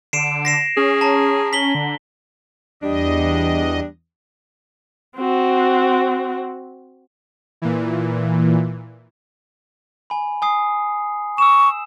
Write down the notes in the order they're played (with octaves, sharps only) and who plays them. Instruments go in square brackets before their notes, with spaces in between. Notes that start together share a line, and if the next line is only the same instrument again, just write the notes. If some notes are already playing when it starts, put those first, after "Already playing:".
[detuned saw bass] D3 [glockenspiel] C7 D7 E7
[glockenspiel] A#6 C7 E7
[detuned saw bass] C#4 [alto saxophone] G#4
[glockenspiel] A5 A#5
B6 F#7 G7
[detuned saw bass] D3
[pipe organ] E2 D#5 [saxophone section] G3 D4
[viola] C4 F#4
[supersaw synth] A#2 E3
[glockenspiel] G#5 B5
G#5 D#6 C7
[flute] C#6 [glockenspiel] E6 E7